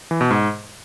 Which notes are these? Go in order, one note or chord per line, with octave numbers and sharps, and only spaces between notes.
E3
B2
G#2